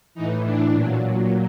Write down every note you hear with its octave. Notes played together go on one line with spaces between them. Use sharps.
A2 E3 D#4
D4
A#2 F#3